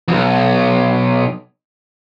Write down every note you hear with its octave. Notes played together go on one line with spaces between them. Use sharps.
B1 F2